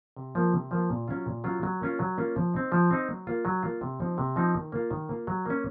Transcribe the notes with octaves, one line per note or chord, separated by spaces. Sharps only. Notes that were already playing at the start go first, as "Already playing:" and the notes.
C3
F3 A#3 F4
C3
F3 A#3 F4
A#2
F#3 C#4 F4
A#2
F#3 C#4 F4
F#3
A#3 C#4 F4
F#3
A#3 C#4 F4
F3
C4 D#4
F3
C4 D#4
F#3
A#3 F4
F#3
A#3 F4
C3
F3 C4 D#4
C3
F3 C4 D#4
D#3
A#3 F4
D#3
A#3 F4
F#3
A#3 C#4